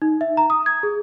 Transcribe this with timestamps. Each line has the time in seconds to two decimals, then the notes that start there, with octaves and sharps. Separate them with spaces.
0.02 D#4
0.21 E5
0.37 A#5
0.50 D#6
0.66 G#6
0.83 G#4